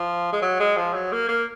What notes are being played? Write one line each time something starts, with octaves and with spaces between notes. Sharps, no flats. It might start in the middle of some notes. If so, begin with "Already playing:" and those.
Already playing: F3
G#3
F#3
G#3
F3
F#3
A#3
A#3